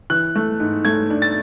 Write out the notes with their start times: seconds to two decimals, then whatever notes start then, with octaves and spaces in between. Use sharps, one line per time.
0.10 E3 F#6
0.36 A3
0.60 G#2
0.85 A3 G#6
1.10 D4
1.22 A6